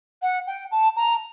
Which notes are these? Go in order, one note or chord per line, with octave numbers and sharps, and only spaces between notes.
F#5
G5
A5
A#5